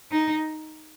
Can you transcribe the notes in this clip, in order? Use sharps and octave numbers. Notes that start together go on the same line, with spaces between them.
D#4